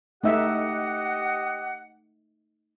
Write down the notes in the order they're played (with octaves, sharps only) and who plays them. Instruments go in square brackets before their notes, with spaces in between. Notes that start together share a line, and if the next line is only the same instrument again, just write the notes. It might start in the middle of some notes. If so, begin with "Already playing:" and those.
[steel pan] A3 D#4 E5 [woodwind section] G4 D#5 F#5